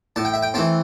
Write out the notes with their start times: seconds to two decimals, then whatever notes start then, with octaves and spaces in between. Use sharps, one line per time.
0.16 A2 A5
0.25 G5
0.34 E5
0.42 G5
0.54 E3 A3 C4 A5